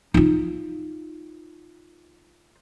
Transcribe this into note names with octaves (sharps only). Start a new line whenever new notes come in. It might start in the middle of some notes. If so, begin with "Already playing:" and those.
D#4 F4